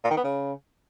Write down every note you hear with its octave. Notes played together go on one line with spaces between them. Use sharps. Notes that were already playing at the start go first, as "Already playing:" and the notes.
A#2
D#3
B3
C#3